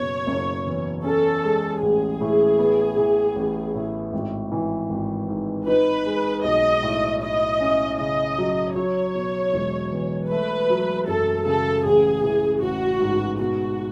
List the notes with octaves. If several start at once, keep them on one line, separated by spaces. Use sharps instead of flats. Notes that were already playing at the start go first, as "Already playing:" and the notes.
Already playing: F#1 B2 C#5
F#1
E2
C#4 A4
G#3
A1 G#4
A2
B3
E3
A1
A2
G#1
E3
G#1
G#2
D#4 B4
G#3
B1 D#5
A2
E4 D#5
C#4
C#3 D#5
F#3
F#3 C#5
B2
E1
E2
A3 B4
F#3
F#2 A4
C#3 A4
A1 G#4
E3
A1 F#4
G#2
B2 F#4